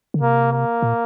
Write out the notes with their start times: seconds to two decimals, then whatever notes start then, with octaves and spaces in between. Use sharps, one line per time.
0.14 D3
0.21 C3 A#3
0.52 A#3
0.82 A#2